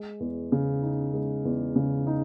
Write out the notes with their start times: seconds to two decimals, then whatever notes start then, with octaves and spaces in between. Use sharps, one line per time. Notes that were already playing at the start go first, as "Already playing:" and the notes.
Already playing: G#3
0.20 E2
0.52 C#3
0.82 D#4
1.14 G#3
1.45 E2
1.76 C#3
2.07 D#4